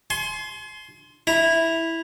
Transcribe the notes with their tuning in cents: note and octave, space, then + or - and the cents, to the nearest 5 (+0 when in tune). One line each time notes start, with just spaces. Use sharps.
G#5 +40 C6 +0
E4 -5 A#5 +0